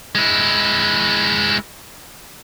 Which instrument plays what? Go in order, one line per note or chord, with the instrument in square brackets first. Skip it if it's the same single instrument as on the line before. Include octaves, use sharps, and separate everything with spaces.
[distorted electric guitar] G#3 E4